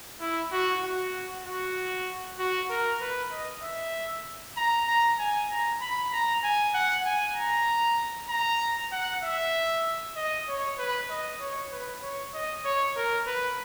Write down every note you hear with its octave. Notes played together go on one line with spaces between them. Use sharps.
E4
F#4
F#4
F#4
F#4
A#4
B4
D#5
E5
A#5
A#5
G#5
A#5
B5
A#5
G#5
F#5
G#5
A#5
A#5
F#5
E5
D#5
C#5
B4
D#5
C#5
B4
C#5
D#5
C#5
A#4
B4